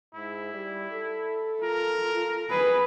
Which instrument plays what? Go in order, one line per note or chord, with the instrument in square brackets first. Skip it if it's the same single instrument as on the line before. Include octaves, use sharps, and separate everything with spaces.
[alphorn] G#2 [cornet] E4
[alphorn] G3
A4
[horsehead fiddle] F4 [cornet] A#4
[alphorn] D#3 [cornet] G#4 [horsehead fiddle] B4